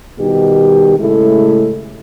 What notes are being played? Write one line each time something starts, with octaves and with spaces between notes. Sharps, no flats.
B2 D#3 G3 D#4 G4
A2 C#3 G#3 A3 E4 A4